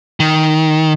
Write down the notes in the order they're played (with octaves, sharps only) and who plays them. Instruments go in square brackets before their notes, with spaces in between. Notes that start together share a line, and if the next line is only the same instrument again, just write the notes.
[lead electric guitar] D#3